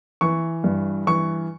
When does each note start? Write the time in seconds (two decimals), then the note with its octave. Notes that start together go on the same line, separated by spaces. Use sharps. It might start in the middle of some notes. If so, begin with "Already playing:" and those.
0.21 E3 C#6
0.64 G2
1.07 E3 C#6